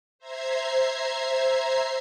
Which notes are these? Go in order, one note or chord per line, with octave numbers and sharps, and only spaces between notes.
C5 E5 A#5 G#6 C7